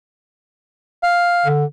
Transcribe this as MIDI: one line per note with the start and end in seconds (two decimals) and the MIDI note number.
1.03 1.48 77
1.46 1.65 50